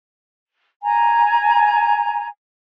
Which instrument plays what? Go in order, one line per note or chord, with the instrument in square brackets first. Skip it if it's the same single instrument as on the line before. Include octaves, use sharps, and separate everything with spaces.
[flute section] G#5 A#5